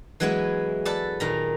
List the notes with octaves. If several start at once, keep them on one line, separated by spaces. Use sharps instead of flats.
E3 F#3 G#3 B3 E4
A4 B4 D5 A5
A#2 D#3 A#5